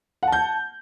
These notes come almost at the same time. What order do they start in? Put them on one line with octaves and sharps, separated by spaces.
F#5 A5 G6